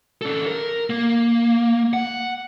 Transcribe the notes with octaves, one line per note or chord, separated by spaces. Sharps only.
C#4 A4
A#4
A#3
F#5